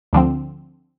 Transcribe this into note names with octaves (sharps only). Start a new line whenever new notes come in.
D2 D3 F3 C4